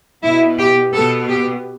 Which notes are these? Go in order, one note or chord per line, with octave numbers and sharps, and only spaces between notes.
B2 B3 E4
G4
B2 B3 A4
G4